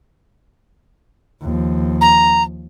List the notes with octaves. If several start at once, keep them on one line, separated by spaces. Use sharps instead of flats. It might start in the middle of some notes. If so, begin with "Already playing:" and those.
D#2 F3
A#5